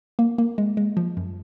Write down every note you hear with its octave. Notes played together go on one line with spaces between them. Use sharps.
A#3
A#3
G#3
G#3
F3
F#2